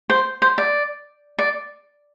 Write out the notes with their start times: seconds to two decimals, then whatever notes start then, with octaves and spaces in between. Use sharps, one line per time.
0.10 C5
0.42 C5
0.58 D5
1.39 D5